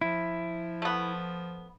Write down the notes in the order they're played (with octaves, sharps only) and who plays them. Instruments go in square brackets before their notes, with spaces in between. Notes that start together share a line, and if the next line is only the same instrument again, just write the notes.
[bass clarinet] F3 [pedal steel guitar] E4
[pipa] A3 B3